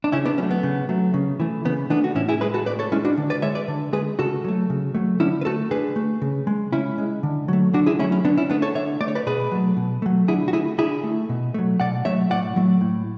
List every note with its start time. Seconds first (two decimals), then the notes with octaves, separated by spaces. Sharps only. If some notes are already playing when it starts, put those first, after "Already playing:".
0.04 D4
0.12 C#3 C#4 E4
0.25 B3 D4
0.38 F#3 A3 C#4
0.51 B3
0.63 C#3
0.89 F#3 A3
1.14 C#3
1.40 E3 A3
1.65 C#3 B3
1.90 E3 A3 B3 D4
2.04 F#4
2.15 A2 C#4 E4
2.29 E4 G#4
2.41 G#3 G#4 B4
2.54 F#4 A4
2.66 A2 B4 D5
2.79 A4 C#5
2.92 G#3 C#4 E4
3.05 D4 F#4
3.17 D3
3.30 B4 D5
3.42 G#3 C#5 E5
3.55 B4 D5
3.68 D3
3.93 G#3 G#4 B4
4.19 C#3 F#4 A4
4.44 F#3 A3
4.70 C#3
4.95 F#3 A3
5.20 D3 C#4 E4
5.41 B4
5.45 A3 F#4 A4
5.71 D3 G#4 B4
5.96 A3
6.22 C#3
6.47 G#3
6.73 C#3 C#4 E4
6.98 G#3
7.23 D3
7.48 F#3 A3
7.74 D3 D4 F#4
7.86 E4 G#4
7.99 A3 C#4 E4
8.03 F#3
8.12 C#4
8.24 D3 B3 D4
8.37 C#4 E4
8.50 A3 B3 D4
8.62 A4 C#5
8.75 D3 C#5 E5
9.01 A3 D5
9.08 C#5
9.15 B4 D5
9.26 B2 G#4 B4
9.52 F#3 A3
9.77 B2
10.02 F#3 A3
10.28 D3 E4 G#4
10.48 F#4
10.53 A3 E4 G#4
10.78 D3 E4 G#4
11.04 A3
11.29 B2
11.54 F#3 A3
11.80 B2 D5 F#5
12.05 F#3 A3 C#5 E5
12.31 A2 D5 F#5
12.56 F#3 A3
12.81 A2